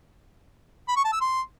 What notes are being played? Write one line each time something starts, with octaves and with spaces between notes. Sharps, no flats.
B5
C#6
A5
E6
C6